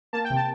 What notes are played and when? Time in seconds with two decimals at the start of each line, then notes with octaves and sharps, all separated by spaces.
0.13 A#3 A5
0.25 G5
0.30 C3
0.36 A5